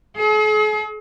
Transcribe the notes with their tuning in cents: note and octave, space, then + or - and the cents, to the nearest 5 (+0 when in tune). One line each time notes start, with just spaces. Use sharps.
G#4 +45